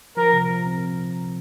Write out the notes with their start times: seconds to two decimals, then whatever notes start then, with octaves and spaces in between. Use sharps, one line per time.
0.17 F3 A#4
0.33 C3
0.50 F3
0.67 C4